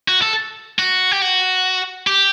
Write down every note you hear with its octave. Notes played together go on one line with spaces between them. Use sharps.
F#4
A4
F#4
G4
F#4
G4